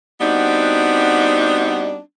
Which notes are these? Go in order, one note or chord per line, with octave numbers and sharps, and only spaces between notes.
G3 B3 C4 D4 D#4 F#4